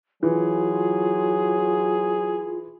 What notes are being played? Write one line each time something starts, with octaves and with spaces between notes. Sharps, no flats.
E3 F#3 F4 G#4